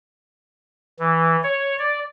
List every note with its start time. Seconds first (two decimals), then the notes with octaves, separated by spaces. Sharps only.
0.99 E3
1.43 C#5
1.79 D5